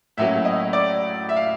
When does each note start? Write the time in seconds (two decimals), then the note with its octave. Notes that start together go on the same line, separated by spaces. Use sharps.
0.17 A2 F#3 A#3 C#4 E5
0.45 D#5
0.73 D5
1.29 E5
1.36 F5